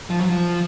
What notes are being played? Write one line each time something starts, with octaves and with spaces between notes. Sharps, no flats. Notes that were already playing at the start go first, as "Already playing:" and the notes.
F3
F#3
F3